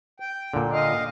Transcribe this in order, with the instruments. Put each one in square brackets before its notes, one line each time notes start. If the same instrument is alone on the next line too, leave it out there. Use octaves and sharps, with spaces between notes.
[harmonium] G5
[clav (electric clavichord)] A#2 D3
[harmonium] D#5 F5